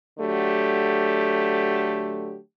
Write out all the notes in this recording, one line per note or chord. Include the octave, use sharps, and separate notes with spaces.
D3 F#3 A3 G4